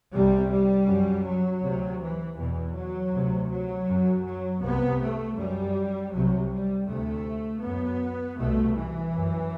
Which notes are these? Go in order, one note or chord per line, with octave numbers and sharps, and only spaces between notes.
C2 C3 G3
G3
F#2
F#3
D2 C3
E3
E2 B2 E3
F#3
D2 C3
F#3
F#2
F#3
C2 C3 B3
A3
F#2 G3
C2 C3 F#3
G3
D2 C3 A3
F#2 B3
C2 B2 A3
E3
F#2